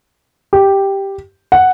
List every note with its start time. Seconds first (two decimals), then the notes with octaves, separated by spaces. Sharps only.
0.53 G4
1.52 F#5